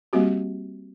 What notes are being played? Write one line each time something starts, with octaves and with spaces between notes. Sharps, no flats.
G3 A#3 C4 F#4 G4